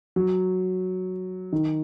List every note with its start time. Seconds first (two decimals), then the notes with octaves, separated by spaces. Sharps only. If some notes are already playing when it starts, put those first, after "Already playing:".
0.16 F#3
1.52 D#3